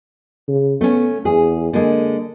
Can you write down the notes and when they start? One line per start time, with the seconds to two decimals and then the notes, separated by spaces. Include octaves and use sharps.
0.48 C#3
0.81 A3 B3 C#4
1.25 E2 G#4
1.73 D3 G#3 A#3